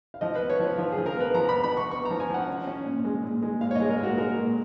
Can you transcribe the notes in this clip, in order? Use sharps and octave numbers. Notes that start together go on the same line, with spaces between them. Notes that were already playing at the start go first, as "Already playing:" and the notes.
F5
F3 D#5
B4
B3
C#5
F3 B4
F3 F4
G#4
F3
A#4
B3 B4
F3 A#5
B5
B3
B5
B3 C#6
B3 C#6
A#5
F3
G#5
F3 F#5
C#4
C#4
A#2
G#3
A#2
G#3
A#2 F5
C#5
G#3 D#5
A#4
A#2
F#4
G#3 A#4
A#2